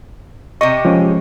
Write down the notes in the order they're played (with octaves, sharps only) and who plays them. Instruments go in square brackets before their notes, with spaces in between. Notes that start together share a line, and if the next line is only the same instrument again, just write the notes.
[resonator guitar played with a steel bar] C3 G4 D#5 [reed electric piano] C#6
[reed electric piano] F3 G#3 C#4